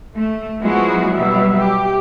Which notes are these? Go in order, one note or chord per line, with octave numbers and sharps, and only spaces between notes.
A3
F3 F#3 G#3 B3 E4 F#4
B2 F#3 G3 E5
G4